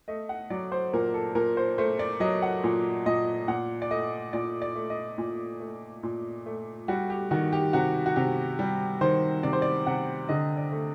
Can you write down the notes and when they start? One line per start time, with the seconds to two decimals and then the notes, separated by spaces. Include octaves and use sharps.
0.08 A3 D#5
0.29 F#5
0.50 F#3 D5
0.72 C5
0.93 A#2 A#4
1.14 A4
1.35 A#2 A#4
1.57 C5
1.78 A3 C5
1.99 D5
2.20 F#3 D#5
2.42 F#5
2.64 A#2
3.06 A#2 D#5
3.48 A#2 F#5
3.82 D5
3.91 A3 D#5
4.33 A#2 D5
4.62 D5
4.76 A3
4.90 D#5
5.18 A#2
5.60 A3
6.03 A#2
6.46 A3
6.88 G3 F#4
7.10 G4
7.31 D#3 F#4
7.52 G4
7.73 C3 F#4
8.06 F#4
8.16 C3 G4
8.59 G3
9.01 D#3 C5
9.43 C3 D5
9.53 C5
9.62 D5
9.86 C3 F#5
10.29 D3 D#5
10.57 D5
10.72 A3